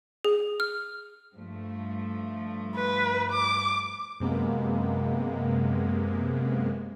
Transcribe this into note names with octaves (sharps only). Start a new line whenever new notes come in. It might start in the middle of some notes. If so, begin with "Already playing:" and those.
G#4
F6
G2 F3 A3
B4
D6
F#2 C3 G#3 A#3 B3